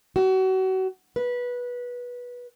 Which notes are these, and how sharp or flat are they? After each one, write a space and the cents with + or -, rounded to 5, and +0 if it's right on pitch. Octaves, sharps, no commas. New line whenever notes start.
F#4 +35
B4 -15